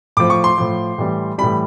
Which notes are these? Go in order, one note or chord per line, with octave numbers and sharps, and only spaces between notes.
A2 F3 D6
C#6
C6
A2 F3
A2 E3 G3
A2 E3 G3 B5